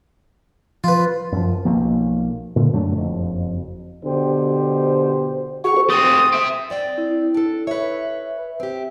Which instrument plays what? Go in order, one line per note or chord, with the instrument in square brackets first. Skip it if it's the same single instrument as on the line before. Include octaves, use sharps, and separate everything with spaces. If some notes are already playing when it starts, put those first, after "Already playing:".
[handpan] F3 [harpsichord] F4 B4
[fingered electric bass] F#2 F3
B1 F3 A#3
A#2 D3
F#2 F#3 A3 D4
F#1 F2
[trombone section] B2 D3 G4 C5
[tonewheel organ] F#4 G#4 F#5 [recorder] C#6
[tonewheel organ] G4 A4 C5
[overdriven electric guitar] A3 C4 [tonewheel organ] C6 [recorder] D#6
[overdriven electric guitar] G4 E5
[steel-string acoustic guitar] C4 D5 G5
[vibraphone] E4
[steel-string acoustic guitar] D4 A4
[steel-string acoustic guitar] B4 C#5 [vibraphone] E5
[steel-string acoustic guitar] C4 G4